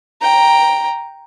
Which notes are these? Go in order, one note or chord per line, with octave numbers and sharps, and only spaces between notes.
G5 A#5